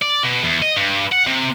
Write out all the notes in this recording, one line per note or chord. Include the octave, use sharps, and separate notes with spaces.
D5
B2
E2
D#5
G2
F#5
C3